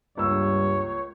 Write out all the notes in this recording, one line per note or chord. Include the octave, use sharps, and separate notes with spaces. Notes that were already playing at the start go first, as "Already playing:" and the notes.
C#2 G2 A#3 C#5 E6